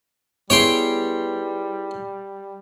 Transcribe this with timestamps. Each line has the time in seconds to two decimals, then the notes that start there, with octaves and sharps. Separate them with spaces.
0.50 G3 B3 E4 G#4 C#5 G5 C6